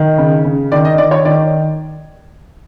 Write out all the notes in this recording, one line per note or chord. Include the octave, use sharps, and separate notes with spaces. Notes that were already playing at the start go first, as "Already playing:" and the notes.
Already playing: D#3
C#3
C#3
D#3 D5
D#5
D#3 D5
C#5
D#3 D5